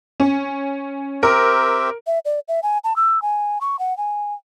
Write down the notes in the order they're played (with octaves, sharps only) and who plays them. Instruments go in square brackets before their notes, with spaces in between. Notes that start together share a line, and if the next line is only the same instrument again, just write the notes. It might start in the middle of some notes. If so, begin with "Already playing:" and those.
[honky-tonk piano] C#4
[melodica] C4 G4 E5 [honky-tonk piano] A#4
[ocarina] E5
D5
E5
G#5
A5
E6
G#5
C#6
F#5
G#5